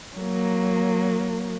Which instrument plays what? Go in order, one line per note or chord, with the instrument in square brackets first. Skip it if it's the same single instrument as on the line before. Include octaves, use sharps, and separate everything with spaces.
[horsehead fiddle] F#3 A#3